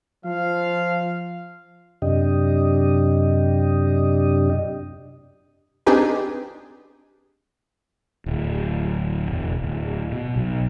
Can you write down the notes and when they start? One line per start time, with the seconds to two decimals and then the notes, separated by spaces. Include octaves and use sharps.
0.25 F3 F5
2.02 F#2 C3 D4 G4 D#5
5.87 C4 D4 D#4 G4 G#4 B4
8.26 D1
9.31 E1
9.62 D1
10.12 B2
10.36 B1